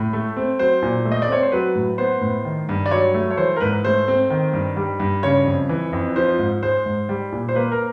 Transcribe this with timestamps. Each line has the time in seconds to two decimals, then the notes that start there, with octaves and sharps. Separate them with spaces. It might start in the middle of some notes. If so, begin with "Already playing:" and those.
Already playing: A2
0.13 A3
0.37 C4
0.59 F#3 C5
0.82 A#2
1.05 A3
1.12 D#5
1.22 D5
1.28 C4 C#5
1.43 C5
1.52 F#3 B4
1.75 A2
1.98 B3 C5
2.21 A2
2.45 D#3
2.69 G2
2.86 D5
2.91 F#3 C#5
3.14 A3
3.31 C#5
3.37 E3 C5
3.56 A#4
3.60 G#2 B4
3.84 A3 C5
4.08 C4
4.30 D#3
4.53 G2
4.77 G3
5.00 G2
5.23 C#3 C#5
5.46 F2
5.69 E3
5.93 F2
6.16 F3 C5
6.39 G#2
6.63 G#3 C5
6.86 G#2
7.09 G3
7.32 A#2
7.49 C5
7.56 A#3 B4
7.72 A#4